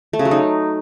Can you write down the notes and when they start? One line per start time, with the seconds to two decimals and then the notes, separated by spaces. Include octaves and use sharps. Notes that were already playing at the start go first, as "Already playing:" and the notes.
0.13 A3
0.19 C#3
0.25 F#3
0.31 D#4